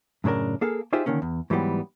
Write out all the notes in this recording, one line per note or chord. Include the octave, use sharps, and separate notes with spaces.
F#2 A2 C#3 D4 A#4
A#3 G#4 A4 F5
D#4 F4 G4 G#4 C5 E5
D3 D#3 A#3 C#4
E2
G#2 E3 F#3 G3 B3